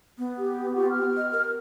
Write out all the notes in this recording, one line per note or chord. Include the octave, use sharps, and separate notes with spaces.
B3
G4
F4 G4 C#6
F6
D#5
A#4